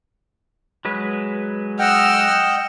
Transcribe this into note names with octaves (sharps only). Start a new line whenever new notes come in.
F#3 G#3 B4
D#5 F#5 G5 E6 F6